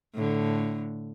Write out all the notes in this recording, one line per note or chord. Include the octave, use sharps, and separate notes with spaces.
A2 D3